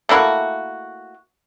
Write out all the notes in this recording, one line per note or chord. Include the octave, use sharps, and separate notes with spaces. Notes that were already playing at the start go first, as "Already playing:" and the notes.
A3 A#3 E4 F#4